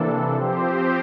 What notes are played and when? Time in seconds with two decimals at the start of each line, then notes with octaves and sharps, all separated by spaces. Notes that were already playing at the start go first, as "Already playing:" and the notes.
Already playing: C3 E3 A#3 D4 A4
0.34 F3 C4 G4 C5